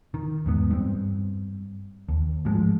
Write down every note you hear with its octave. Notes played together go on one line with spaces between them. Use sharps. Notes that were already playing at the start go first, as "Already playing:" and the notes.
D#3
E2 G#2 B3
G2 C4
D#2
A1 G#2 F3 G#3